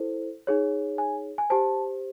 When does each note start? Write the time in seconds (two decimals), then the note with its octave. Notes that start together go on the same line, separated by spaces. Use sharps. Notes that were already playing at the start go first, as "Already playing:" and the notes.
Already playing: E4 A4 C5
0.47 D#4 G#4 C#5
0.98 G#5
1.38 G#5
1.50 G4 C5 A5